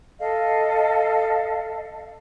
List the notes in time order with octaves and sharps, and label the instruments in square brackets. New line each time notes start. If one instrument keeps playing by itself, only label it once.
[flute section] A4 D#5 F5